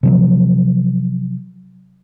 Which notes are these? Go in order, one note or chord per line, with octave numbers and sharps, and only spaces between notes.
C3 F3 F#3